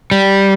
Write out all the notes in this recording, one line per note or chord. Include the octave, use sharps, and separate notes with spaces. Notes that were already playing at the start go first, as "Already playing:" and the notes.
G3